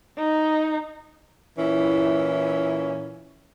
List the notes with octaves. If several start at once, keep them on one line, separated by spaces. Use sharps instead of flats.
D#4
A#2 E3 C#4 E4